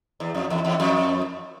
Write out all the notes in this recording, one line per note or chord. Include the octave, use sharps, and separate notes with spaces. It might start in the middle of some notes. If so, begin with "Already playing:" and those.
E2
F2
E2
E2
F2